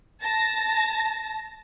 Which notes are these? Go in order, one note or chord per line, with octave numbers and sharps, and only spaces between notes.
A5 A#6